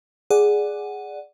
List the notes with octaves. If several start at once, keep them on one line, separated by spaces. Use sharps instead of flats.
G#4 D5 F#5